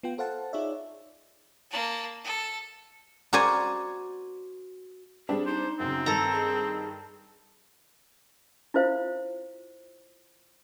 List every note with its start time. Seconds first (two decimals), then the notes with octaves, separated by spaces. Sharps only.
0.03 B3 F4 G5
0.18 A4 C5 F5 F#5 A5
0.53 D#4 F4 G#4 C#5 D5 E5
1.70 A#3 A5
2.24 A4
3.33 F#4 A#4 C5 D5 G#5
5.29 G3 C4 D4 G#4
5.46 D#4 C5
5.80 F#2 C#3 C4
6.06 G2 D#3 A4 A#5
6.33 G#4
8.74 E4 F4 C5 F5